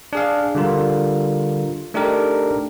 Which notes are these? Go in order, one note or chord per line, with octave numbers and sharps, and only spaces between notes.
D4 G#4 F5
D3 G3 F4 A#4
A3 D4 D#4 G4 A#4